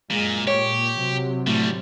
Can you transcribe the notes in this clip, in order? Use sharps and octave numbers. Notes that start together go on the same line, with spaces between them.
F#2 A#2 G#3
A#2 G4 C#5
C3 F#3
A2 D3 G3